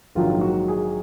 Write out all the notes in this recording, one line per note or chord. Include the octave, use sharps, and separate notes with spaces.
A#1 G#2 D#3 F#3 F4
F#4
G#4